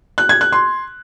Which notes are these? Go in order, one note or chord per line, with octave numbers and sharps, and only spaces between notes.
F#6
G#6
F#6
C6